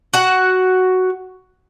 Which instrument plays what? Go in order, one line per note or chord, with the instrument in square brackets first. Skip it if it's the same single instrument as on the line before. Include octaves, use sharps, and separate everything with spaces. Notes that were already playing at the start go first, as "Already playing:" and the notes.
[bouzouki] F#4 F#5